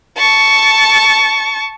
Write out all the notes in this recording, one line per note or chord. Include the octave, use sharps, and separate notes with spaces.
A5 C#6